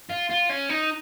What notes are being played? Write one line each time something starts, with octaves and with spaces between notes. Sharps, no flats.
F4
F4
C#4
D#4